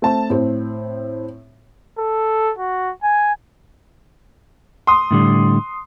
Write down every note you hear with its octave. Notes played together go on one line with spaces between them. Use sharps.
A3 C4 A5
A2 C4
A4
F#4
G#5
C6 D#6
A2 D3 G3